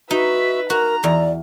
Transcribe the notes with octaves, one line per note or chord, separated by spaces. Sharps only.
D#4 F#4 B4 E5
F#4 A#4 A#5
E2 D5